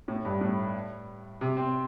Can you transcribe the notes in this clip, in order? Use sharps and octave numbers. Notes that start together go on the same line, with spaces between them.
A2
G2
A2
C3
C4